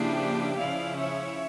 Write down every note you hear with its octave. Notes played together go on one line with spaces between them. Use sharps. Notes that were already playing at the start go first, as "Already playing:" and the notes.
Already playing: C#3 F3 A#3 D4 E4 G4
C#3 F3 C#4 E4 D5 F5
C#5 E5